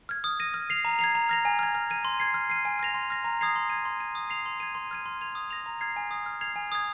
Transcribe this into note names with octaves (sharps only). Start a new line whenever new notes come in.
F6 G#6
D#6
A#6 D#7
F6
C7 F7
A#5
G#6 C7 F7
A#5
F6 A#6 F7
G#5
F6 G#6
F6
G#6 D#7
C6
G#6 C7
F6
C7 D#7
G#5
F6 A#6 F7
C6
F6 A#6
A#5
D#6 G#6 C7 F7
C6
G#6 D#7
C6
G#6 D#7
D#6
C7 F7
C6
G#6 D#7
C6
F6 G#6 D#7
C6
G#6 F7
D#6
A#6 F7
A#5
F6 G#6 C7
G#5
D#6 C7
F6
G#6 C7 F7
G#5
D#6 G#6